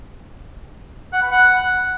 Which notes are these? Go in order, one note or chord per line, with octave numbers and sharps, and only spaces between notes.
F#5
B4
F#5